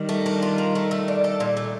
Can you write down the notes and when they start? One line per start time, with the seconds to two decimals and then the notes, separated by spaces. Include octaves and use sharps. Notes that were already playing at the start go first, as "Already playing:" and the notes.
Already playing: D#3 G3
0.09 A3
0.26 D4
0.42 F4
0.58 A#4
0.75 A3
0.91 A3
1.08 D4
1.24 A4
1.40 A#2
1.57 A3